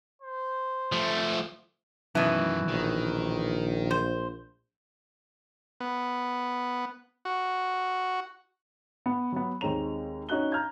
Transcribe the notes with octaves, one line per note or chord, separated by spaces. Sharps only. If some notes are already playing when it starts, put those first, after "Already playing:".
C5
F3 A3
F#2 B2 D#3 E3
A#1 D#3
C5
B3
F#4
B3
F#3 B3
D#2 G#3 C4 C#5 A#5 F7
C#4 D#4 F#4 F#6 G7
A#5 F6 G6 G#6